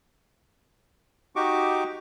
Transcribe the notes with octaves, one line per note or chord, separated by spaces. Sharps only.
D#4 F#4 G4 C#6 D6